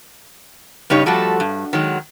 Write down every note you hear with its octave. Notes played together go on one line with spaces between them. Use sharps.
G2 C#3 D#4 G4 C#5
F3 G3 A3 F#4 A4
G2
D#3 F#3 G#3